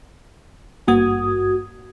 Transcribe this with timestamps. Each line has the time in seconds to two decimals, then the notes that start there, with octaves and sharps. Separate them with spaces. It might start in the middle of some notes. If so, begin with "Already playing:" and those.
0.88 G#1 G2 A#3 F#4 D#6 G#6